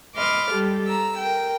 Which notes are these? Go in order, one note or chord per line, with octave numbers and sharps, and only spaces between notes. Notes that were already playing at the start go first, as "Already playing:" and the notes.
D#5 B5 C6 D6 F6
G3 G4 A4
A#5 E6
A#4 G5